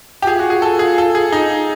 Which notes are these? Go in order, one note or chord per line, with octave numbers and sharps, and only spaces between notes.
G4
F4 G#4
F#4
G#4
A4
G#4
A4
G#4
D#4